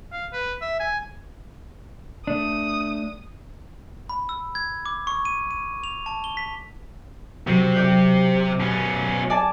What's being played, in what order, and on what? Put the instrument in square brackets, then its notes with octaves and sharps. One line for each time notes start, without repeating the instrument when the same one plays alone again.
[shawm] F5
B4
E5
G#5
[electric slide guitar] A3 D4 [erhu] D#6
[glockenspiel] B5
E6
G#6
D6
C#6
D#7
D#7
F7
A5
G7
B6
[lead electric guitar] C3 [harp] F#3 C7
[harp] G4 D5 G6
[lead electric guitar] B2 C#4
[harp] D5 G#5 A5